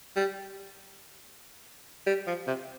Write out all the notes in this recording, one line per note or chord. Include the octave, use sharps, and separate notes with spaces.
G3
G3
F3
C3